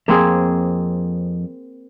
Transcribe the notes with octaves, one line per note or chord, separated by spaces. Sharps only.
F2 A#3 C4 G#4